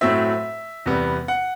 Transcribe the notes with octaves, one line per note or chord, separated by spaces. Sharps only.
A2 F#3 A3 C4 E5
E2 C3 G3 B3
F#5